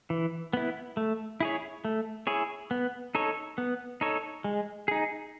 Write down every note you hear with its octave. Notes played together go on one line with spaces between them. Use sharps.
E3
B3 E4
A3
E4 G#4 C#5
A3
E4 G#4 C#5
B3
D#4 A4 C#5
B3
D#4 A4 C#5
G#3
D#4 G#4